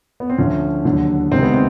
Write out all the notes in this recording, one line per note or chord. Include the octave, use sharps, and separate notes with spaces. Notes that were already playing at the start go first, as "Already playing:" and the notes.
B3
C4
D2 D3 F3 C#4
D#2 D3 F#3
C#2 C3 D#3 G#3 C4
B3
C4